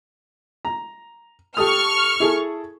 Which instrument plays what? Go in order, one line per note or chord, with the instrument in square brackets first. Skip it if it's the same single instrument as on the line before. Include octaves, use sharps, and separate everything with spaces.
[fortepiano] A#5
[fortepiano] G4 A4 D#6 [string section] C#6 F6
[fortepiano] E4 G#4 A4